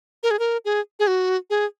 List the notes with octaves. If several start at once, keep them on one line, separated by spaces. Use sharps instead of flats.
A#4
G#4
A#4
G#4
G#4
F#4
G#4